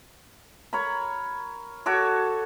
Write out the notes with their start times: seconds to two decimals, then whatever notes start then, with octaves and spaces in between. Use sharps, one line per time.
0.73 A#4 C#5 A#5 B5
1.86 F#4 A4 C#5 D6